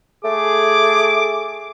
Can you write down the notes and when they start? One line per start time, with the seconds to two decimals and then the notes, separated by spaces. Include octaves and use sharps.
0.25 A3 G#4 D6